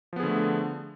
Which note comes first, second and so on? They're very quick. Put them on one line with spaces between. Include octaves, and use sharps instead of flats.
F3 B3 G#4 D3 A3